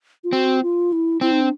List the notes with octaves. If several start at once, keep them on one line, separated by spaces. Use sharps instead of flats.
F4
C4 F#4
F4
E4
C4 E4
D#4
D4